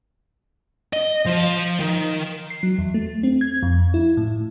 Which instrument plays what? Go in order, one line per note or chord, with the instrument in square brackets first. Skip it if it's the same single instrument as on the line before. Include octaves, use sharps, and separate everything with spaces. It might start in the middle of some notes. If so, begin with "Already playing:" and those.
[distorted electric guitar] D#5
F3
D#3
[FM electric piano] C7
F#3
E2
A3
C4
G#6
F2
E4
A2